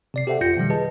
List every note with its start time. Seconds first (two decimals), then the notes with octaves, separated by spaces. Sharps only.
0.14 C3 D5 C7
0.27 G4 A4 C5 E5 F#5 G5
0.41 G#1 F2 F4 G6 A#6 C#7
0.57 B2 D#3 F3 G3
0.70 G#4 B4 D#5 A5